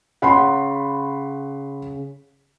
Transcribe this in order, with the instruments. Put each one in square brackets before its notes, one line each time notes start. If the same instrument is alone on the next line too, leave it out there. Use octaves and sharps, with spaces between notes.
[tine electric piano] C#3 [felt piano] F#5 B5 C6